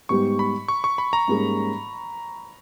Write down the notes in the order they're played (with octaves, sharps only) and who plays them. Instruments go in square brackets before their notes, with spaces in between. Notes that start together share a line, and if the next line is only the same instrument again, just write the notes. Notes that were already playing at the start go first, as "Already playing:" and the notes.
[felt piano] G#2 G3 B3 G4 [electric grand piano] C#6
[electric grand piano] B5
C#6
C#6
B5
A#5
[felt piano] G#2 G3 A#3 C#4 G#4